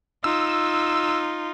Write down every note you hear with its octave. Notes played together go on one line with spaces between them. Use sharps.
D#4 F4 E6